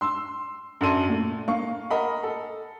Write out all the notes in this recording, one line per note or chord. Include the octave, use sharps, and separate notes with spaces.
C6 E6
F#2 D4 A4 A5 C6 D#7
A#2 A3
A#3 F5 C#6
A#4 D#5 F#5 B5
A4